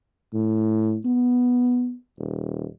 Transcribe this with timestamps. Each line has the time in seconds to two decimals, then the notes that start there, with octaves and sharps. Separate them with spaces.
0.33 A2
1.05 B3
2.18 D#1